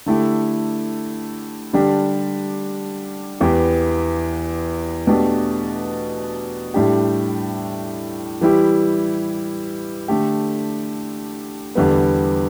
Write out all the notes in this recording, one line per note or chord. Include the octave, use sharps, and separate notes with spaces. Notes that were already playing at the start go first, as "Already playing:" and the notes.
D3 A3 E4 G4
D3 G3 D4 G4
E2 E3 B3 G4
B2 A3 D4 G4
A2 G3 D4 G4
E3 G3 E4 G4
D3 A3 G4
E2 D3 G3 B3